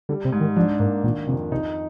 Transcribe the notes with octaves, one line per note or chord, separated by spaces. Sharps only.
D3 G3
C3
G#2
D#3
F3 D4
G#2 A#3
A#2 D#3
F2 C3
C3 D#4